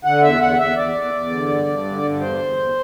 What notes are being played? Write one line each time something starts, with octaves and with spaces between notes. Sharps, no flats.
D3 F#5
E2 E5
E2 F#5
E2 E5
E2 D5
E2
E2
D3
G2
G2
D3
G2
E2 C5
E2
E2